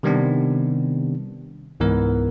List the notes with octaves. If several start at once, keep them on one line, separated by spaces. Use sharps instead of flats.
C3 D#3 G3 B3 C4 D4
C#2 G#2 E3 B3 A#4